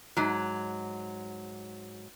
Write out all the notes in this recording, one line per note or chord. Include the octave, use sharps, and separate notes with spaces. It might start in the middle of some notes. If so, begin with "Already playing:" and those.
G#2 F#3